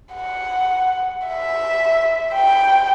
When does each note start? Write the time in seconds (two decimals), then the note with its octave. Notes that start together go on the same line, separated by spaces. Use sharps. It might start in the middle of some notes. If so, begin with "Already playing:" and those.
0.14 F#5
1.27 E5
2.34 G5